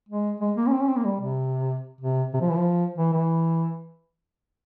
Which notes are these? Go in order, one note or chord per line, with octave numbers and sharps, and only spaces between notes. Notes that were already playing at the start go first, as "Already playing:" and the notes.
G#3
G#3
A#3
C#4
C4
C#4
C4
A#3
G3
C3
C3
C3
F3
E3
F3
E3
E3